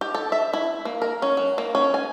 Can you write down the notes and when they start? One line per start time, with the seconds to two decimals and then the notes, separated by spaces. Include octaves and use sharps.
0.01 G4
0.15 A4
0.32 E5
0.53 E4
0.85 A#3
1.02 A#4
1.22 C#4
1.37 F#3
1.58 A#3
1.75 C#4
1.94 G#5